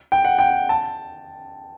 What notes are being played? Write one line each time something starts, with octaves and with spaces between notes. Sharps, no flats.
G5
F#5
G5
A5